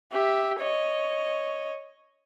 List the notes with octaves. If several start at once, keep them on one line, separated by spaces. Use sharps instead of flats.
G4 E5
C#5 D#5